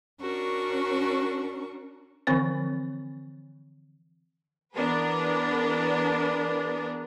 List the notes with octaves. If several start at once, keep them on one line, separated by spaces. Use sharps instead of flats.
C#4 D4 F#4 A#4 C#6
D3 E3 F3 C4 C5 C#5
E3 B3 D4 G#4 A#4 B4